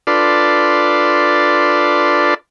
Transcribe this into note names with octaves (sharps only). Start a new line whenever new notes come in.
D4 F4 A4 B4 D5 C6